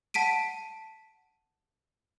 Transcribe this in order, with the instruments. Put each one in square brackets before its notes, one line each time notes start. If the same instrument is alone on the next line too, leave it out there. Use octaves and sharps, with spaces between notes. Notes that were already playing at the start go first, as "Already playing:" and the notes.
[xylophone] F#5 A5 B6 D7 D#7